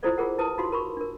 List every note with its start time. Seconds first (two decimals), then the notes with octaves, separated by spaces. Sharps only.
0.03 E4 F4 A4 C5 D5 D#5
0.18 F4 G#4 A#4 F#5
0.38 E4 B4 A5 D#6
0.58 D#4 F4 F#4 F5 C6
0.72 A#4 B5 C#6
0.97 D4 A#4